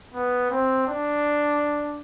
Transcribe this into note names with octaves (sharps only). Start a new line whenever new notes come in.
B3
C4
D4